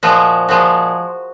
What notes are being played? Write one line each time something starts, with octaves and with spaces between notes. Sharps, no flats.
A#2 F3 G#3 F#4
A#2 F3 G#3 F#4